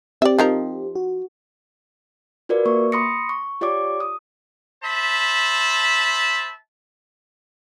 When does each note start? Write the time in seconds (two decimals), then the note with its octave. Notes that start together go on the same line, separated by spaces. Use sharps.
0.22 C4 G4 D5 E5
0.39 F3 D#4 A#4
0.95 F#4
2.49 F4 F#4 A#4 B4 D5
2.65 A#3 C#6
2.92 B5 C6 D#6 A#6 C#7
3.29 C#6
3.61 F4 G4 C#5 D5 D6
4.00 D#6
4.84 C5 E5 A5 B5